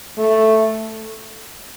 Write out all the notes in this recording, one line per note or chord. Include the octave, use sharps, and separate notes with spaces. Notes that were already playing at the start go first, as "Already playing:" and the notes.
A3